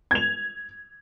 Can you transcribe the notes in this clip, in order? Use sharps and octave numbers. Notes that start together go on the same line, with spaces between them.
G#6 F7